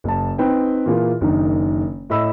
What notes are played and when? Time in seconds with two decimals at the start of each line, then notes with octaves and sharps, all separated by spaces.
0.04 F#1 A5
0.38 C4 D#4 B4 G5
0.86 A#2 E3 A#3 F4 G#4
1.21 F#1 D#3 D4 D#4
2.10 A2 A4 D#5 B5 E6